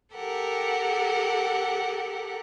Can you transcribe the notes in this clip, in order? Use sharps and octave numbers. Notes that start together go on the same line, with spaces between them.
G4 A4 A#4 F#5